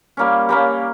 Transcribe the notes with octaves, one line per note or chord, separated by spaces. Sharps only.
G3 A#3 C#4
G3 A#3 C#4